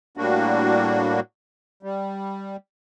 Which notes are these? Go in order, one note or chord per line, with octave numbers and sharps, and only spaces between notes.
A2 G3 A#3 D4 F#4
G3